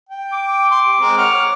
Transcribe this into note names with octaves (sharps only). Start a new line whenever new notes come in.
G5
D6
C6
G4
G#3 C4 A#4
C#5 F#5 F6